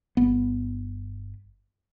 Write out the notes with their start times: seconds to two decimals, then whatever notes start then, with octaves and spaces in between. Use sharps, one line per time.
0.17 G1 B3